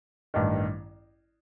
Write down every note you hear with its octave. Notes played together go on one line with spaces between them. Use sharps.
A1 G2 D#3